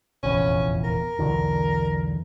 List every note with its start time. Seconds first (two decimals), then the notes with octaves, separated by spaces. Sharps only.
0.23 F1 A#1 E2 C#4
0.84 A#4
1.19 B1 E2 D3